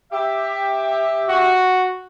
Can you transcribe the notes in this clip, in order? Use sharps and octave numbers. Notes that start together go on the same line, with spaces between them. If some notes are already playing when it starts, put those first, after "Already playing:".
G4 E5
F#4